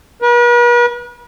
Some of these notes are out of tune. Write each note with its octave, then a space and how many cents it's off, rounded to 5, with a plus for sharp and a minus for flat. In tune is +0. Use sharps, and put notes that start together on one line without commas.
B4 -45